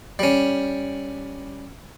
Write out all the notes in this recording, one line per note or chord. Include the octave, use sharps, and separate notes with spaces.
G3 C#4